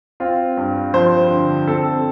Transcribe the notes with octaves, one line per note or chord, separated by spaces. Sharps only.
C4 F4
G2
F3 C5
D3
C4 A4